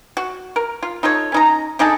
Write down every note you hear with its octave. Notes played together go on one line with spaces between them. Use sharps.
F#4
A#4
F4
D#4 F4 A4 C#5
C#4 D#4 A#5
D4 D#4 G#4 A4